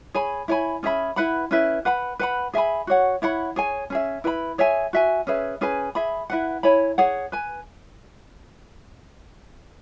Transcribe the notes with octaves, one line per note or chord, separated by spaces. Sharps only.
G#4 C#5 G#5 B5
E4 C#5 G#5 B5
C#4 G#4 E5 B5
E4 B4 F#5 B5
C#4 E4 B4 E5
B4 F#5 B5
B4 F#5 B5
G#4 E5 G#5 B5
F#4 C#5 F#5
E4 C#5 F#5 B5
G#4 C#5 G#5
C#4 G#4 E5
E4 B4 E5 B5
G#4 C#5 E5 G#5
F#4 E5 G#5
C#4 G#4 B4 E5
C#4 G#4 B4 G#5
G#4 E5 B5
E4 B4 F#5
E4 C#5 G#5 B5
G#4 C#5 F#5
B4 G#5